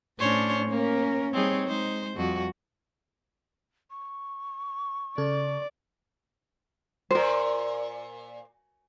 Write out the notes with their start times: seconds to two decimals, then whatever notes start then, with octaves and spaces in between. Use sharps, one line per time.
0.19 A2 C#4 D4 C5 C#5
0.70 A#3 C#4 A#4
1.34 G3 C4 D#4 G#4 C#5
1.68 G#3 D#4 C5
2.17 F2 G3 F#4
3.90 C#6
5.18 C#3 A4 D5
7.11 F#2 A#2 A#4 C5